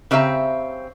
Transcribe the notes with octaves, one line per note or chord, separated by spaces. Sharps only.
C#3 C4 G4 E5 A#5